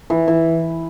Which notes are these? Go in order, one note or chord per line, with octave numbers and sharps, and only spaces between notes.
E3
E3